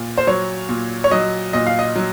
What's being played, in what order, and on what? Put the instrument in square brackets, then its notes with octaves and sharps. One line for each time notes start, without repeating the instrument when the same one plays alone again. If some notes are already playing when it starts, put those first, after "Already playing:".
Already playing: [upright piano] A#2
C5
F#3 C#5
A#2
C#5
F#3 D#5
A#2 D#5
F5
D#5
F#3